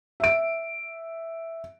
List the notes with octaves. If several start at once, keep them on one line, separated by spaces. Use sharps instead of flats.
E5 D7